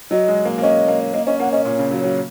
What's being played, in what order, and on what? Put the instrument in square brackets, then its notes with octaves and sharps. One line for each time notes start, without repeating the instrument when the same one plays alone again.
[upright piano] F#3 [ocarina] D#5
[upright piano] G#3
A#3
A#3
[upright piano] C#4 [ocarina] D#5
[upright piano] A#3
[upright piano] A#3 [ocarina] D#5
[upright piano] C#4 [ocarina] D#5
[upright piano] A#3 [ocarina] F#5
[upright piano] C#4 [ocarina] D#5
[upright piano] A#2 [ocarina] C#5
[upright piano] C#3
F#3
F#3